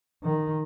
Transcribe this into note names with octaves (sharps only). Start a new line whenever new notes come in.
D#3